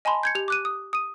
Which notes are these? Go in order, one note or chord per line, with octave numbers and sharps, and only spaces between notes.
D#5 G#5 A5 B5 C6
G6 G#6 C#7
G4 F7
D6 F#6 D#7
D#6
D#6 D#7